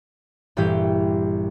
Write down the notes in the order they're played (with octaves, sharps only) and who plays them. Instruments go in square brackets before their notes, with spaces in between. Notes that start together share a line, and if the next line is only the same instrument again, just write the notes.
[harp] A#1 G2 E3 G4 G6